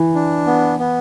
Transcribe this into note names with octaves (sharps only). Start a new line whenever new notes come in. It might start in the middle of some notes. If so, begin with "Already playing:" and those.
Already playing: E3
D4
B3
B3